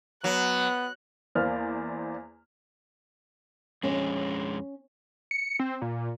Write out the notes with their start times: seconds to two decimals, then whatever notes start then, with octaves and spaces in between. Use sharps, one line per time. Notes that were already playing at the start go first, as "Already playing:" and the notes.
0.24 F#3 B3 F#6
1.35 E2 A#3 C5 D5 F6
3.83 F2 G#3 C#4
5.31 C#7
5.60 C4
5.82 A#2